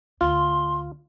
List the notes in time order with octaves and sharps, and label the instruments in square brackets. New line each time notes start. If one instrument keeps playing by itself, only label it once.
[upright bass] D2 [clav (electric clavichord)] F4 [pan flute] C6